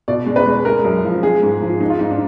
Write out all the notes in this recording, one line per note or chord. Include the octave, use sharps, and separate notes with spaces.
B2 D5
G#3
B4
G#3
G#3 A#4
F#2
F3
G#3 G#4
G#2
F3
G#3 D#4
F4
G#2 D#4
D4